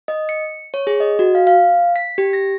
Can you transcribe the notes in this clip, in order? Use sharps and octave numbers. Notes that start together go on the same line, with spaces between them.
D#5
C#7
C#5
G#4
D#5
F#4
F5
F5
B6
G4
A#6